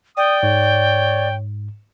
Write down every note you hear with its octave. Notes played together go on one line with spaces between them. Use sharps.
D5 G5 D#6
G#2 C#5